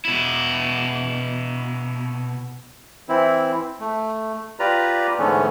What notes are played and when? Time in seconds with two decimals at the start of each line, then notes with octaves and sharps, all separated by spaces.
0.05 B2 E4
3.09 E3 C4 E4
3.80 A3
4.59 F4 G4 B4 D5 A#5
5.19 G#2 D3 E3 A3 B3 C#4